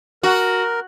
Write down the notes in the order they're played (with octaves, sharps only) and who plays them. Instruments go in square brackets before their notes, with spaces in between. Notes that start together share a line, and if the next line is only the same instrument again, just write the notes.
[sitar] F#4 [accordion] A#4